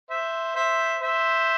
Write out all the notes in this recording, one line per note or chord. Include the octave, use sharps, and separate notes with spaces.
C5 E5
C5 E5
C5 E5